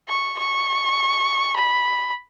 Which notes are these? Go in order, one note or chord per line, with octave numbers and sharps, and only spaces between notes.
C#6
C#6
B5